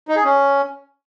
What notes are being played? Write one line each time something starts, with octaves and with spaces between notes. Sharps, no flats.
D#4
G#4
C#4